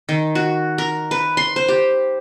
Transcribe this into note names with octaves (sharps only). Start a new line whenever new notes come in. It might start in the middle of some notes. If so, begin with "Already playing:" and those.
D#3
F#4
A#4
B4
C6
C5
G4